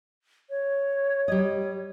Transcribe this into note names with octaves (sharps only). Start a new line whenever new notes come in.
C#5
G3 D#5